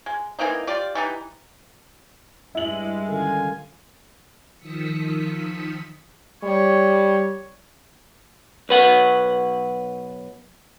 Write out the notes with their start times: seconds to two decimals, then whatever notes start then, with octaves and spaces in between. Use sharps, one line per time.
0.06 G#3
0.39 E3 A#3 C4 D#4
0.67 F4 G4 D5
0.95 E3 G3 D#4
2.55 G2 G#3 E4 F#7
3.08 D3 D#3 C#4 F4 G#5
4.58 D#3 F3 D#6 E6 B6 C#7
6.44 G3 C#5
8.69 B1 B4 F#5